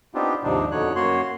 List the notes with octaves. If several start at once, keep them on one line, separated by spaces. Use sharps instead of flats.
B3 C4 D4 D#4 F4 G4
D#2 G#2 C3 F3 D4 D#4
F2 B2 D3 D#4 C#5 F#6
F#2 A#3 F#4 C#5 C6